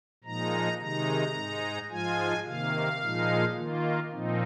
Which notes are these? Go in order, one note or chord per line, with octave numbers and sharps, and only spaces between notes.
A#2 F3 G#3 D#4 A#5
C3 D#3 G#3 D#4 A#5
G#2 G#3 D#4
G#2 F3 G#3 F4 G#5
C3 D#3 A#3 F5
A#2 F3 G#3 D#4
D#3 A#3 F4
A#2 F3 C4 D#4